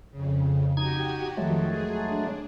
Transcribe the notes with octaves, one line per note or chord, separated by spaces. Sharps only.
F2 C#3
D#4 F#4 G4 G#6
F2 D#3 F3 F#3 G#3 A3
G#4
D4